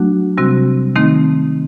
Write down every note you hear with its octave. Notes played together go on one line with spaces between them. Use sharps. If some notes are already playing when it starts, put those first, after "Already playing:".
Already playing: F#3 A3 D4 F#4
C3 G3 C4 F#4
D#3 A3 C4 D#4